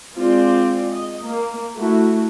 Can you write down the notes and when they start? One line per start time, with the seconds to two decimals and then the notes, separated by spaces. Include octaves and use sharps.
0.15 G#3 C4 F4 D5
0.91 D#5
1.25 A#3
1.76 A3 E4 F#4